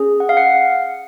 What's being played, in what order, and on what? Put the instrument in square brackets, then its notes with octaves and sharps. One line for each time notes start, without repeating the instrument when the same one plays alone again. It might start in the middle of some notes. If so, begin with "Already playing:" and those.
Already playing: [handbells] C#4 G#4
F#5
F5
F#5